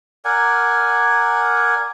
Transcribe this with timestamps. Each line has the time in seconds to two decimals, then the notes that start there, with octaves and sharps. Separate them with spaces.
0.25 A#4 D5 F#5 G#5